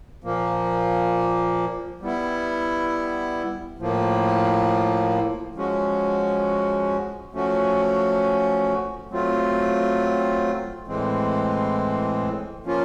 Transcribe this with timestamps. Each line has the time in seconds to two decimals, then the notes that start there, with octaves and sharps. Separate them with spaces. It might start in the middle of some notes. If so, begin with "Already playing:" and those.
0.24 A#2 F3 A#3
2.01 G3 B3 E4
3.78 A2 F3 A#3
5.55 F3 G#3 C#4 F#4
7.33 F3 A3 C#4 F#4
9.10 F#3 A3 C4 F4
10.87 A2 E3 G#3 C4
12.64 F3 A#3 C#4 F4